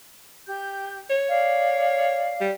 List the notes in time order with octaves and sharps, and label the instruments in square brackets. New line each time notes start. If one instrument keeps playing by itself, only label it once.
[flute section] G4 G6
[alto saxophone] C#5
[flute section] D5 F5
[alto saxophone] G3